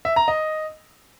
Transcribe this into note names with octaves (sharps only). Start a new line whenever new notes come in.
E5
A#5
D#5